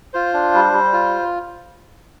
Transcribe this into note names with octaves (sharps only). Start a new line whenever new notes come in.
F4 C5
D4
G3
G3
F4